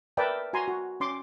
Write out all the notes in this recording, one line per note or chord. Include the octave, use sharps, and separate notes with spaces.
A#4 B4 D5 E5 G5 A5
F#4 G#5 A#5 C6
F#4
C#4 C6 D6